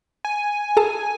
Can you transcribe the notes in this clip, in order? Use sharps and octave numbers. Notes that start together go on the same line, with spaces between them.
G#5
G#4 A4 A5